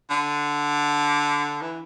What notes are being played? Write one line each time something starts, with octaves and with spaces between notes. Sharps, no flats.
D3
E3